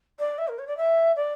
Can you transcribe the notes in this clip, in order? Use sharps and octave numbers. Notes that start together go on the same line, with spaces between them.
D5
E5
A#4
C#5
D5
E5
D5